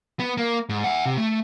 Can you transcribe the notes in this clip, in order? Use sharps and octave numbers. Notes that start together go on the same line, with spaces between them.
B3
A#3
G#2
E5 F#5
C3
A3